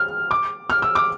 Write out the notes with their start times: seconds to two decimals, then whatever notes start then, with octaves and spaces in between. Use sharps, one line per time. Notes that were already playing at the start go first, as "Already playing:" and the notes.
Already playing: F6
0.31 D6
0.70 F6
0.82 E6
0.95 D6